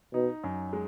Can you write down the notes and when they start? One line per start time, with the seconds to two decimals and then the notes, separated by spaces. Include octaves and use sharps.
0.14 B2 D#4
0.44 F#2
0.73 G#3